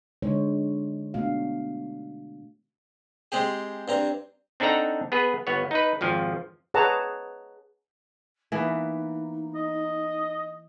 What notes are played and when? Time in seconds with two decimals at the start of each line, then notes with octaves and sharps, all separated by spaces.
0.22 D3 G#3 D#4 C5 C#5
1.14 B2 A3 D4 F#4 F5
3.32 G#3 C4 G4 G#4
3.88 G2 C4 A#5
4.60 C4 D4 D#4 A4 F#5 A#5
5.12 B3 G#4 B4
5.47 G1 B3 C#5
5.71 D#4 B4
6.01 G#1 F2 F3
6.74 G#4 B4 C#5 F#5 A5 A#5
8.52 E3 A#3 B3 D#4
9.55 D#5